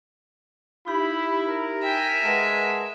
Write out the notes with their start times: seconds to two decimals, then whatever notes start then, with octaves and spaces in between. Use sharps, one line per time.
0.87 D#4 E4 G4 B5
1.46 A#4
1.83 E5 G5 G#5
2.24 G#3 B4 F#5 A5